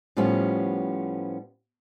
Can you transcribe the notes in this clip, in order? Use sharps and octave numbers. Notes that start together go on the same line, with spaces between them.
A2 F3 G3 B3 C#4 F4